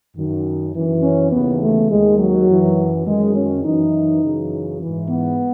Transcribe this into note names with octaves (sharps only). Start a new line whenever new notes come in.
F#2 D#3
F#2 E3
C#4
D#2 C#3 E3 B3
A3
D#2 D#3 G#3
F#3
F#2 E3
F#2 D#3 G#3
C#4
F#2 E3 D#4
F#2 C#3 E3
G#2 E3
B3